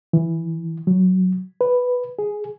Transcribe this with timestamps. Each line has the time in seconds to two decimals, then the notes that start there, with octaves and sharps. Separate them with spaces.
0.13 E3
0.87 F#3
1.61 B4
2.19 G#4